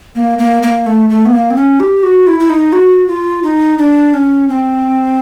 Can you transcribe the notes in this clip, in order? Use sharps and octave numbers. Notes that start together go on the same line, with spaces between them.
A#3
A#3
A#3
A3
A3
B3
A#3
C4
C#4
G4
F#4
E4
E4
D#4
F#4
F4
D#4
D4
C#4
C4